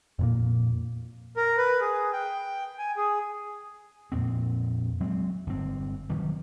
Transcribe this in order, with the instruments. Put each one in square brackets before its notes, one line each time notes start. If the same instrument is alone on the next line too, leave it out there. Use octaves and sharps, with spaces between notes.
[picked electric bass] F2 A#2 A#3
[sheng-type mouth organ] A#4
B4
G#4
G5
G#5
G#4
[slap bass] F2 A#2 C4
F#3 G#3 C4
G1 C4
F1 D#3 F#3 G3